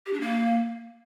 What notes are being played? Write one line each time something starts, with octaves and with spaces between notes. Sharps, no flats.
G4
D4
A#3